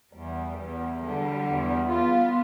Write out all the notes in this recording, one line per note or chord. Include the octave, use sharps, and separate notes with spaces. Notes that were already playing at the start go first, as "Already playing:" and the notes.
E2 G3
E2
D3 G3
E2
B3 F4